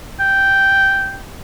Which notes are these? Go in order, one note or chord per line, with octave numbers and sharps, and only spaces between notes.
G5